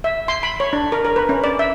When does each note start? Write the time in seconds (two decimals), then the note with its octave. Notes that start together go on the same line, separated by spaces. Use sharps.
0.04 E5
0.28 C6
0.43 B5
0.60 C#5
0.73 D4
0.92 A#4
1.05 A#4
1.16 B4
1.29 C#4
1.44 D5
1.59 E5